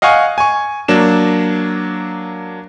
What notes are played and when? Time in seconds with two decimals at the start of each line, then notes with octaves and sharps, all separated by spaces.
0.02 D#5 F5 F#5 G#5 C#6
0.38 G#5 C#6
0.88 F#3 A#3 D4 E7